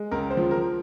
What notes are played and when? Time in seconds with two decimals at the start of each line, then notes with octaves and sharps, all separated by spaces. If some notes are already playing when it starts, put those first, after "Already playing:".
Already playing: G#3
0.11 C#2 A#4
0.30 C5
0.37 F3
0.51 A#4